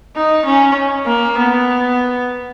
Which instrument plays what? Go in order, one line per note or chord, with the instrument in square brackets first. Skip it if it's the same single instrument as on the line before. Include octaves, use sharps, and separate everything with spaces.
[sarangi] D#4
C#4
A#3
B3